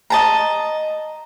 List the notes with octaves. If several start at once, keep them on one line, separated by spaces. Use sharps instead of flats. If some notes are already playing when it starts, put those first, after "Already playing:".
D#5 A5 A#5